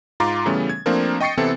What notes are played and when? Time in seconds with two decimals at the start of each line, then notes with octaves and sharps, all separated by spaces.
0.20 G#2 F4 A#5 C6 D6 A6
0.46 C#3 E3 G3 A3 B3 C#4
0.69 G#6
0.86 F3 A3 A#3 C4 D4 A#4
1.20 D#5 G5 C#6 A6 C7 C#7
1.37 C3 E3 B3 C4 E4 A4